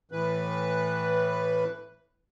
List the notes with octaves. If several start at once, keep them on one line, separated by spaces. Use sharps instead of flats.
A2 E3 B4